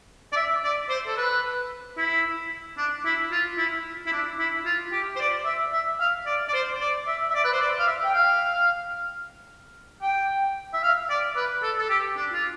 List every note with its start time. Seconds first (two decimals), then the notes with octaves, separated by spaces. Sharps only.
0.32 D5
0.36 E5
0.64 D5
0.89 C5
1.06 A4
1.17 B4
1.97 E4
2.77 D4
3.05 E4
3.31 F4
3.58 E4
4.06 E4
4.12 D4
4.39 E4
4.65 F4
4.92 G4
5.15 C5
5.20 D5
5.45 E5
5.72 E5
6.00 F5
6.26 D5
6.48 D5
6.53 C5
6.80 D5
7.07 E5
7.30 E5
7.34 D5
7.44 B4
7.52 C5
7.60 D5
7.79 F5
7.87 E5
8.03 G5
8.14 F5
10.02 G5
10.73 E5
10.83 F5
11.09 D5
11.36 B4
11.62 A4
11.78 A4
11.89 G4
12.17 D4
12.32 F4